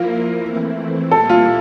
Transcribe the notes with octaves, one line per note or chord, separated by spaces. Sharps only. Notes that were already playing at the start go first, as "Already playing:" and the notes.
Already playing: F3 A#3 E4 F4 A#4
E3 A3 C4 E4
A#2 G3 A#3 E4 A4
F4